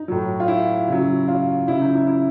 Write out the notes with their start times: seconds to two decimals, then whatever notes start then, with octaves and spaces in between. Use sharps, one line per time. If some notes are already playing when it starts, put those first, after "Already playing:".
Already playing: D#4
0.08 A2 F#3
0.40 F4
0.48 E4
0.88 C#3 F#3
1.28 F4
1.67 C#3 F#3 E4
1.81 D#4
1.95 E4
2.07 E4